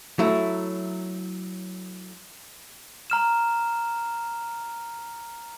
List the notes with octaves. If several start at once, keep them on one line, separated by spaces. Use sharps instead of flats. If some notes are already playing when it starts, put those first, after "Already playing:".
F#3 A3 E4
A#5 F6 E7